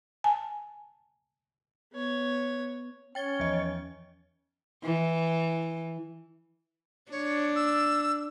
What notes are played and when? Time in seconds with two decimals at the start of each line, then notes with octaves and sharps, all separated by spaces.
0.24 G#5 A5
1.93 B3 C#5
3.15 C#4 C#5 G5 A6 G7
3.40 E2 F3 D#5
4.83 E3
7.11 D4 C#5
7.56 E6